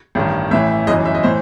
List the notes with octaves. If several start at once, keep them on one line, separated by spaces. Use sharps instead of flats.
A1 G2 D#3
A1 A2 E3 E5
G1 F#2 E3 D#5
E5
D#5
A2 E3 C5